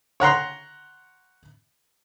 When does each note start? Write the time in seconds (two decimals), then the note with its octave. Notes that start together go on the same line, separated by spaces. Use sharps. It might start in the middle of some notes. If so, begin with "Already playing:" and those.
0.20 C#5 F#5 A#5 C6